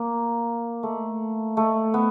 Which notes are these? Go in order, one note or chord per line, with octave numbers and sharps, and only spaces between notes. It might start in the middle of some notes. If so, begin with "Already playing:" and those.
Already playing: A#3
A3
A3
B3